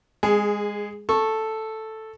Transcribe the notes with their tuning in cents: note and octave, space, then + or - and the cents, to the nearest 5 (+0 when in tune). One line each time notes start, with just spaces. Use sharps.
G#3 -20 G#4 +5
A4 +0 C#6 -15